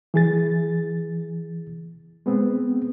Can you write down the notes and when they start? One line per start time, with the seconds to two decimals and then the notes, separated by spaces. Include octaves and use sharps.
0.14 E3 G#4 A6
2.26 G#3 B3 C4